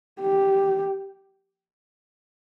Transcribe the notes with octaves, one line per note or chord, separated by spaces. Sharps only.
G4